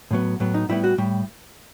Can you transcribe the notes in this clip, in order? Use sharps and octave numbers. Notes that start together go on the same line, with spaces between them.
A2 F#3 B3
A2 F#3 B3
D#4
A2 G3 B3 E4
F#4
A2 G3